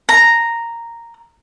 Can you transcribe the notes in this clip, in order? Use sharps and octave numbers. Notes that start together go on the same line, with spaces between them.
A#5